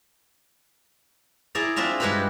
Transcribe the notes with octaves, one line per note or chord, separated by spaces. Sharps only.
E4 G#4 D5 A#5
C4 D4 F4 E5 A#5
G2 G#3 G4 B4 A#5 B5